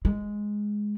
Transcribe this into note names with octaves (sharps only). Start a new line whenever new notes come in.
G#3